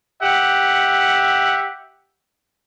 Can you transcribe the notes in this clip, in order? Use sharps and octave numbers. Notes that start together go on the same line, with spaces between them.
G4 E5 F#5